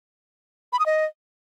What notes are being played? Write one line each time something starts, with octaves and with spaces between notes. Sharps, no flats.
B5
D#6
D#5